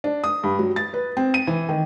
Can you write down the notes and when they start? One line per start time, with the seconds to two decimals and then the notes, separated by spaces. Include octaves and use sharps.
0.04 D4
0.24 D#6
0.44 G2
0.59 F#3
0.76 A6
0.94 B4
1.17 C4
1.34 D#7
1.47 E3
1.69 D#3